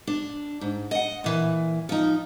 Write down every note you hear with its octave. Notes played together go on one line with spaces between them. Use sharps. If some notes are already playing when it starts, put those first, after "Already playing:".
D4
G#2
D#5 F#5
A#2 E3
F3 D#4